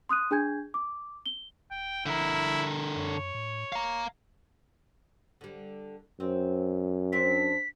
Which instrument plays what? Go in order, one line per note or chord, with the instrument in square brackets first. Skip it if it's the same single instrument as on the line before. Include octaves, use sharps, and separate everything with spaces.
[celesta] C6 D#6 F#6 D#7
D4 G#4 G#5 G6 G#6
D6
G7
[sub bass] D#1 [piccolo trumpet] G5
[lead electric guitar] D3 A#4 [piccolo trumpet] E4
[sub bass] F#2 [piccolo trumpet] C#5
[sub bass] A2
[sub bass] D1 [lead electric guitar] F5 A#5
[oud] D3 G3
[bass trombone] F#2 [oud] C4
[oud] C4 D4 [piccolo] B6